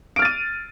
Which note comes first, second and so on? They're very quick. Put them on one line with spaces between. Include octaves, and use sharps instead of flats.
D7 F6 A6 D#7